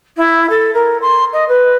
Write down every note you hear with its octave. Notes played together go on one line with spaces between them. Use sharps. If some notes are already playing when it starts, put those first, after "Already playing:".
E4
A4
A#4
C6
D#5
B4